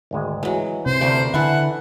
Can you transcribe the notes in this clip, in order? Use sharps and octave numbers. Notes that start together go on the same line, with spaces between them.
G#1 D2 G#3
E3 F#3 G#3
C3 C5
D2 A3 A#4 B4 D5
D3 E3 E4 A4 F#5 C#6